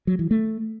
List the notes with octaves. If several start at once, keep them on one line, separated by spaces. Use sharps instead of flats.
F#3
E3
A3